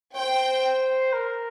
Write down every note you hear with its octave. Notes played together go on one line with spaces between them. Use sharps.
C5 G5
A#4